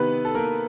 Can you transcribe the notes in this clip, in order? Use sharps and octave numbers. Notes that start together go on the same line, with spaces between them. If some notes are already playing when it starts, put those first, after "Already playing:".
Already playing: C3 D#3 B3 B4
A4
A#3 A#4